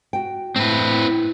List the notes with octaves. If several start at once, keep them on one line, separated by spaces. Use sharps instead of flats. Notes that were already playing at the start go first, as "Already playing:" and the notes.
F#4 G5
A2 C4 B4